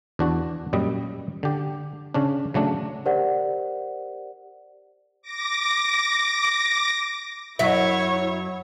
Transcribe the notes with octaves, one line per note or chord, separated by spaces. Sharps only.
E2 D4 F#4
F#2 A#2 G3 D#5
D3 G4
C#3 C#4 D4
C#3 F#3 A3 D4
G4 A#4 C5 D5 F#5
D6 A#6
F#2 F#3 E4 C#5 E5